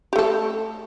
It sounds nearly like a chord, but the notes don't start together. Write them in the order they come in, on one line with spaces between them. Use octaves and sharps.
G4 A3 A4